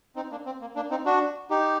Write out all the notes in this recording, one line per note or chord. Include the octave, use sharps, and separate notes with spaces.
C4 D#4
A#3 D4
C4
A#3
A#3 D4
C4 D#4
D4 F#4
D#4 G4